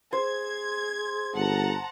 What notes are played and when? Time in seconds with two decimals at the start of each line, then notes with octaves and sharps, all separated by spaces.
0.13 G#4 C5 G#6
1.35 G1 F#5 A5 A#5